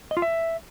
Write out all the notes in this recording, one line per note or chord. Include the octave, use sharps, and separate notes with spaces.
D#5
F4
E5